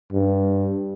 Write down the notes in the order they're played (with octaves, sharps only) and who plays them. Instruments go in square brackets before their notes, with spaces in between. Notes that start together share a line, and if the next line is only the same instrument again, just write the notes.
[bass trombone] G2